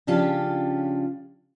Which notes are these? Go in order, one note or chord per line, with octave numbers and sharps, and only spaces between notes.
C#3 F3 C#4 D4 F4 G4